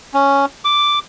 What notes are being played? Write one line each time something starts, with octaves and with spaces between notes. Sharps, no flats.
C#4
D6